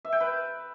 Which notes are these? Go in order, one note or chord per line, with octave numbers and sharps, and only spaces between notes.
E5
G5
B4